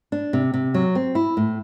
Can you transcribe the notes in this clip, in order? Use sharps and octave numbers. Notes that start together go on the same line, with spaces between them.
D4
C3
C3
F#3
C4
E4
A2